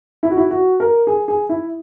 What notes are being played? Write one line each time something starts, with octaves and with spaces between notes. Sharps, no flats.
E4
F#4
E4
F#4
A#4
G#4
G#4
E4